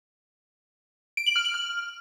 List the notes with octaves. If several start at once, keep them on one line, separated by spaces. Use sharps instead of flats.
D7
F#7
F6
F#7
F6